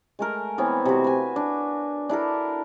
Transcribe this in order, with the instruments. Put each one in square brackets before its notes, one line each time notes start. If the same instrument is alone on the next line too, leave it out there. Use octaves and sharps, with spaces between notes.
[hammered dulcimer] G#3 A3 A#4
E3 B3 C4 C#5
C3 F#4
B4 G#5
D4
D4 E4 A4 A#4